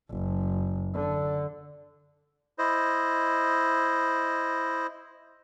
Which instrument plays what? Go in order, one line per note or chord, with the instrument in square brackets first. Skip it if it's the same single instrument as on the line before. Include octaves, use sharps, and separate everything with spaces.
[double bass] F#1
D3
[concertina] E4 C5 D#5